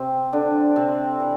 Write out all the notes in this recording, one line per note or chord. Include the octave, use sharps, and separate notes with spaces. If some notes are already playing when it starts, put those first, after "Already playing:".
Already playing: C3 C4
D3 D4
C3 C4
E3